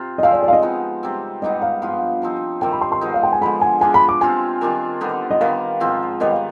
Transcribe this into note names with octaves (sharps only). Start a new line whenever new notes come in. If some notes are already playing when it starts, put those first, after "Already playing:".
Already playing: C3 F4
D#5
F3 G#3 C4 F5
D5
D5
F5
D#5
F3 B3 D#4
C3 G3 C4
G#2 G3 B3 D#4 D#5
F5
G2 F3 B3 F4
C3 F3 C4 D#4
C3 D#3 G3 C4 G5
B5
C6
C6
G#2 F3 B3 D#4
F5
G5
G#5
D3 F3 G#3 B5
G#5
F3 G#3 D4 F4 G#5
B5
D6
C3 F3 C4 F4 G#5
D#3 G3 D4 F4
D3 G3 B3 D#4
D#5
D#3 G3 B3 F5
G#2 F3 C4 F4
D#3 G3 B3 D#5
F5